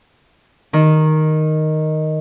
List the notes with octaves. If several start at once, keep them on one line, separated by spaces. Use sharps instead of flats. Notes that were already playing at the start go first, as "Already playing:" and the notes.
D#3